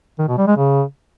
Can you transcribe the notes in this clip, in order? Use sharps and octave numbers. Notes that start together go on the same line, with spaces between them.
D#3
B2
G3
G#3
C#3